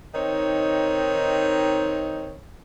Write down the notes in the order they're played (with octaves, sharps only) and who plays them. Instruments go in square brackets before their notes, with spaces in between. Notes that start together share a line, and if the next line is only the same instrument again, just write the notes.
[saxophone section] D#3 C4 D#4 C#5